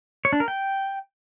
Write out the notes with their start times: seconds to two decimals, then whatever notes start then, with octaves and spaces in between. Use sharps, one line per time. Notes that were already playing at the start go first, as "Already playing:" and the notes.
0.25 C#5
0.33 D4
0.40 A#4
0.48 G5